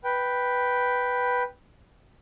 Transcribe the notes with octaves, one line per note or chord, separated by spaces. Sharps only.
B4 G5